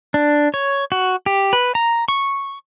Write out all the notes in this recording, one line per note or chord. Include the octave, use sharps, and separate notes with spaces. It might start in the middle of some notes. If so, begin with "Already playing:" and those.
D4
C#5
F#4
G4
B4
A#5
C#6